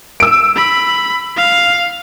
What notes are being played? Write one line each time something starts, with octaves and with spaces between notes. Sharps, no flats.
E6 D7
B5
F5